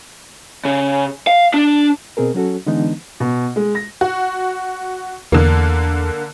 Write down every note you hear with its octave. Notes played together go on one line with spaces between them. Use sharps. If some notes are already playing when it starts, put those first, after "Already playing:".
C#3
F5
D4
B2 C4 G#4 A#4
F#3 C#4 F#4 A4
D3 E3 G#3 B3 D4 D#4
B2
G#3
A#6
F#4
E2 D3 A#3